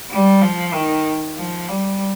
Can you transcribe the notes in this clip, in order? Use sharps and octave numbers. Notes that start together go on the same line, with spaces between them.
G3
F3
D#3
F3
G3